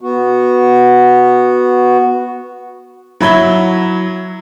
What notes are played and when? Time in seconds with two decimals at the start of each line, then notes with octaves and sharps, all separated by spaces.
0.01 B3 F#4
3.20 F#3 E4 B5 G#6 G7